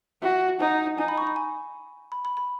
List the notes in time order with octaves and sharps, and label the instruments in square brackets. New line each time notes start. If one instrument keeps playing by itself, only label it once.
[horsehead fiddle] F#4 [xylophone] E5
[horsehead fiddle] D#4 [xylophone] F#5
[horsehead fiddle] D#4 [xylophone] G#5
[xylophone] B5
C#6
B5
G#5
B5
B5
B5